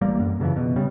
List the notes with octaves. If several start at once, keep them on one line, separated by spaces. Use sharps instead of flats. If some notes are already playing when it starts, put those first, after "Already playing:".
A1 G3 A#3
F#2
F#2 C#3 E3 F3
B2
C#3 G3